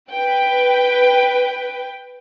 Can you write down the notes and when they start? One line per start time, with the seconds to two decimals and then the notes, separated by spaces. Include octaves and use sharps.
0.12 B4 G5